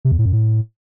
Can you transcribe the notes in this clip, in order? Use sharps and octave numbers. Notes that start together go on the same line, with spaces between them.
C3
E2
A2
F#2
A2